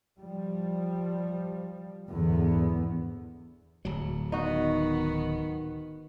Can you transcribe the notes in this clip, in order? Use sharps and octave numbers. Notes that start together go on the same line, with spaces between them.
F3 G3
F#1 E2 G#2 D3 B3
D1 F#3
D#3 B3 D#4 F#4